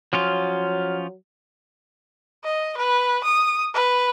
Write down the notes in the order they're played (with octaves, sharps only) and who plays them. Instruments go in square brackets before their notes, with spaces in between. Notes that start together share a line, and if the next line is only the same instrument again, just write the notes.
[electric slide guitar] F3 C#4 F4 [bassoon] F#3
[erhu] D#5
B4
D#6
B4